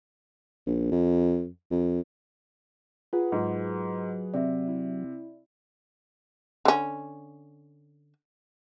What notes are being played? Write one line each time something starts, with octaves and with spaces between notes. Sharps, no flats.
A#1
F2
F2
F4 G#4 B4 F#5
G#2 F#3
C3 D5 E5
E4
D3 C#4